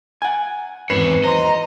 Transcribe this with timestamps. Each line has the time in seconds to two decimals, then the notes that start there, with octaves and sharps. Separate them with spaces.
0.22 F#5 G#5
0.90 G#1 E2 B4 C#5 C7 E7
1.24 C5 D#5 A#5 C6